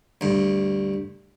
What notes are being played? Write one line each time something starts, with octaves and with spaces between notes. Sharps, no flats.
D2 G2